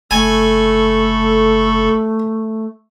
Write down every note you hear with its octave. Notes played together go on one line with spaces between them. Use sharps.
F#1 A3 A4 G#5 B5 C#6